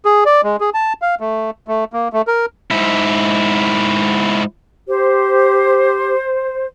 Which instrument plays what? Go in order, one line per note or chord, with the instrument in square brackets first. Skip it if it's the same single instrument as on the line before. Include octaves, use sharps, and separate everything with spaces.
[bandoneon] G#4
D5
G#3
G#4
A5
F5
A3
A3
A#3
A3
A#4
[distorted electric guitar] G#2 E4
[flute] G4 [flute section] C5